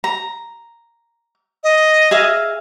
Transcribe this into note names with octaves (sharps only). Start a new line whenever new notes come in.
A#5
D#5
G#4 E5 F5